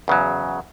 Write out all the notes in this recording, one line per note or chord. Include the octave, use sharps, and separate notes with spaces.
E2 C#3 F#3